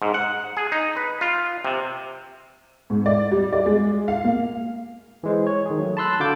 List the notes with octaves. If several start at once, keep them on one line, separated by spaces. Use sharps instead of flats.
G#2
F#5
G#4
D#4
B4
F4
C3
G#2
D5
G3
D5
G#3
F5
A#3
E3 G#3 C5
C#5
D#3 G#4
F#3 A3
A5 B5 C6 E6 F#6
D3 F#4 F5 A5 D6 G6